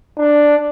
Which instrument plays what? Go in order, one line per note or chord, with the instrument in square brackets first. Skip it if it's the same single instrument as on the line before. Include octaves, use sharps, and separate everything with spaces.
[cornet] D4